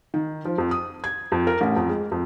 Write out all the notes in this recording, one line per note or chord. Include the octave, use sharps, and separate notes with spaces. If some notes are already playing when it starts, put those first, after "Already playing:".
D#3
F3
F2
D#6
G#6
F2
A#4
A1
F2
G#3
F2